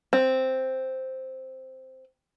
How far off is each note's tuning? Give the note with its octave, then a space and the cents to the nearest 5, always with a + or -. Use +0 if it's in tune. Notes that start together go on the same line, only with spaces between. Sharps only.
C4 +0